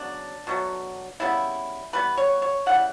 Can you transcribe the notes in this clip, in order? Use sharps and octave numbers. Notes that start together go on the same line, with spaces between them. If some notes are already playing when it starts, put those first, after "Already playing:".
Already playing: C#3 F#3 B3 D4
B2 F#3 A3
C#3 G3 B3 E4
E3 G3 B3 B4
C#5
C#5
C#3 E3 G3 F#5